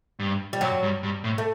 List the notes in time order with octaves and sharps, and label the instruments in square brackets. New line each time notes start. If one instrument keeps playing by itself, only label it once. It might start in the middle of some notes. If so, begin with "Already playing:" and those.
[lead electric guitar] G2
[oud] G3
[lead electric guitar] F#2 [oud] F#3
[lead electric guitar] G2
G2
A2
[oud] A3